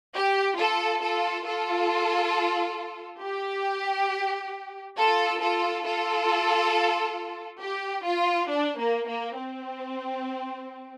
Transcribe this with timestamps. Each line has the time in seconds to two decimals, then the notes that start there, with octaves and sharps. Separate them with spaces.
0.14 G4
0.57 F4 A4
1.02 F4 A4
1.46 F4 A4
3.22 G4
4.97 F4 A4
5.41 F4 A4
5.85 F4 A4
7.61 G4
8.05 F4
8.50 D4
8.79 A#3
9.08 A#3
9.37 C4